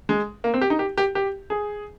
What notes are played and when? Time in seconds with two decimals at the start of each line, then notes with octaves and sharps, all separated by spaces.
0.09 G#3
0.44 A#3
0.54 C4
0.61 G4
0.70 D#4
0.79 G4
0.97 G4
1.15 G4
1.50 G#4